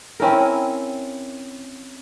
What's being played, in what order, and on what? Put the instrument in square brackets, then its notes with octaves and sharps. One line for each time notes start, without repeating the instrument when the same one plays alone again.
[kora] C4 C#4 E4 A#4